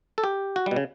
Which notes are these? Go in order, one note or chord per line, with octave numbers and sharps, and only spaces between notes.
A4
G4
F#4
G3
B2
C#3